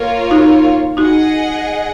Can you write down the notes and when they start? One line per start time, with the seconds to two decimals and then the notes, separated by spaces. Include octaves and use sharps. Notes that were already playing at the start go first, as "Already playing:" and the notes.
Already playing: A#3 F4 A#4 C#5
0.31 D#4 F#4
0.97 D#4 F#4 G#4 D#5 F#5